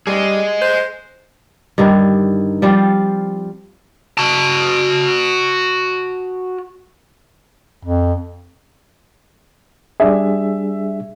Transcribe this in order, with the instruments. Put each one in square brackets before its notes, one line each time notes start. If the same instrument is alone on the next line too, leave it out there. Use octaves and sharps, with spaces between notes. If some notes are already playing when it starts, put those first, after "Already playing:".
[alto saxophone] G3 [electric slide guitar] G#4 D#5
[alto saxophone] C5
[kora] G2 D3 D#3 D#4
F3 G3 C4 F4
[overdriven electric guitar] F#4 A5
[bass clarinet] F2
[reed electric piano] G3 D4 G#4 [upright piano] E5